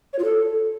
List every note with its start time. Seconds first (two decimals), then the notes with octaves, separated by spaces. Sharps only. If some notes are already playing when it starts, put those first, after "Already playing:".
0.13 C#5
0.19 F4
0.24 A4